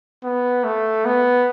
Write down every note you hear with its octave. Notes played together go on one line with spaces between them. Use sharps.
B3
A3
B3